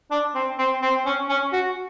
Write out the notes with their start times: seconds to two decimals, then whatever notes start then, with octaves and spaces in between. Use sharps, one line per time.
0.11 D4
0.35 C4
0.59 C4
0.82 C4
1.06 C#4
1.29 C#4
1.53 F#4